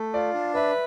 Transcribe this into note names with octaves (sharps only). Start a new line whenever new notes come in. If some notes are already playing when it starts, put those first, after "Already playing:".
Already playing: A3
F4 D5
D4
B4 E5